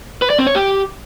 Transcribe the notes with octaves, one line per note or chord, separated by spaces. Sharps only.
B4
D5
C4
C#5
G4